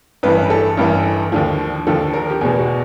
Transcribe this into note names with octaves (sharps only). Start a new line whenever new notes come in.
A1 G2 E3 B4
A4
A1 G2 E3
D#2 D3 F3
D#2 D3 F3 A4
A#4
G4
E2 B2 G#4
F#4